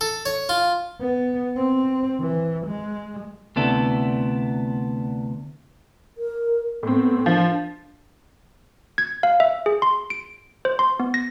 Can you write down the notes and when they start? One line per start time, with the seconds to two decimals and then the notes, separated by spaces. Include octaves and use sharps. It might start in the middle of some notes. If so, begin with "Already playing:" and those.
0.01 A4
0.26 C#5
0.49 F4
1.01 B3
1.56 C4
2.20 E3
2.67 G#3
3.56 D2 C3 B3 D4 E4 A4
6.18 A#4
6.83 A2 B3 C4
7.26 F3 D4
8.98 G#6
9.23 F5
9.40 E5
9.66 G#4
9.82 C6
10.10 D7
10.65 C5
10.79 C6
11.00 B3
11.14 A#6